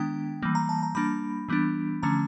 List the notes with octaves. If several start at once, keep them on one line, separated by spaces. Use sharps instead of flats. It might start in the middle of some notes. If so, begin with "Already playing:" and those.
Already playing: D#3 G#3 B3 D4 G5
E3 G3 A#3
A#5
A5
A#5
G3 A#3 D4 B5
E3 G3 B3 D4
D3 F3 A3 C#4 A#5